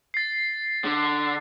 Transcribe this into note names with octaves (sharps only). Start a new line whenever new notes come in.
A6 C7
D3